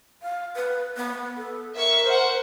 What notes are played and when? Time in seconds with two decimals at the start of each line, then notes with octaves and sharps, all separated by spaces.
0.22 F5
0.56 B4
0.97 B3
1.37 A4
1.75 A#4 E5 C#6
2.05 C5 F#5